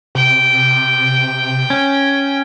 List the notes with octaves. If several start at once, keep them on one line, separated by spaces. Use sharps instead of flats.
C3 G5
C#4